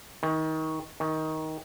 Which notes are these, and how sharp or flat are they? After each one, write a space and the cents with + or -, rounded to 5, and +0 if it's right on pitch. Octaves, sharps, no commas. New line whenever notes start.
D#3 +25
D#3 +15